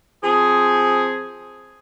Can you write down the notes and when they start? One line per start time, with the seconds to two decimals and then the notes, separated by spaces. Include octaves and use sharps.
0.24 F3 C4 G#4